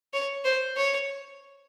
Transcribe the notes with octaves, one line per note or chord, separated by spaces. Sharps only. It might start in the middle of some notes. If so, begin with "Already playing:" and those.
C#5
C5
C#5